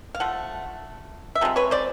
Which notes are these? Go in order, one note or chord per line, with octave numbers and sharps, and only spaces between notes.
F5
F3 A3 F#5
E5
C3 F3 G#3
B4 C#5
C5 D5